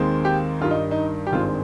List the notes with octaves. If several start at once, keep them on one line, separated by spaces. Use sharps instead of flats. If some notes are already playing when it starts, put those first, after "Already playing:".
Already playing: D#2 D#3 G#3 C4
G4
G2 D#3 G3 F4
D#4
D#4
G4
G#1 G2 D#3 G#3 C4 F4